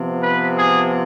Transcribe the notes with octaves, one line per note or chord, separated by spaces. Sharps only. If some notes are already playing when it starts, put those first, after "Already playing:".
Already playing: C3 F3 B3
B4
G#4